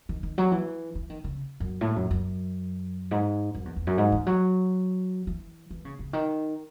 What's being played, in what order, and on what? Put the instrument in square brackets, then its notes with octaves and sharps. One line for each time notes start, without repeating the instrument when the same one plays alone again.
[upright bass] D#3
D#3
F#3
E3
E3
D#3
C#3
F#2
A2
F#2
F#2
G#2
F#2
E2
E2
F#2
G#2
E3
F#3
E3
E3
C#3
C#3
D#3